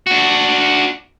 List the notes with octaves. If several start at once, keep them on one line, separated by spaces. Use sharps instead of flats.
D4 F#4